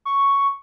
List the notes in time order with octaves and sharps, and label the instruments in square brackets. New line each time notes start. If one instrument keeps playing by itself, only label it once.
[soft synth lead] C#6